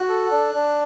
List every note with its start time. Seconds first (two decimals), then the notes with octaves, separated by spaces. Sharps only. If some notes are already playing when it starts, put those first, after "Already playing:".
Already playing: F#4 F#6
0.08 A4
0.31 D4
0.53 D4